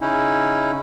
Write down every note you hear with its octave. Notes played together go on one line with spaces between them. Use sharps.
C#3 C#4 D#4 E4